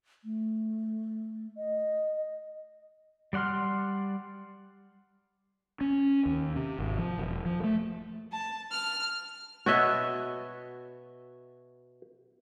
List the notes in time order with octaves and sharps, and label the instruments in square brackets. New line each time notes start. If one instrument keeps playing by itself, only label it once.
[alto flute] A3
D#5
[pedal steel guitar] G3 D5 F#5 C6 F6
[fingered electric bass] C#4
D#2
C3
G#1
F3
E1
F3
A3
[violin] A5
F6
[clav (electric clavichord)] B2 B3 D#5 [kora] F#4 C#5 E5